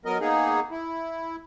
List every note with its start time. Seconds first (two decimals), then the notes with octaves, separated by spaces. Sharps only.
0.05 F#3 B3 A#4 D#5
0.20 A#3 B3 D#4 G#4
0.71 E4